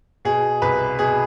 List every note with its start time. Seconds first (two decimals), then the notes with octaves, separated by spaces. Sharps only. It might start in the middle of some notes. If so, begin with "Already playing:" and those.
0.25 B2 G#4
0.62 C2 B4
0.99 B2 G#4